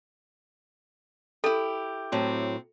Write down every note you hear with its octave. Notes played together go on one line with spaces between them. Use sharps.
E4 G4 A4
A2 F#3 C4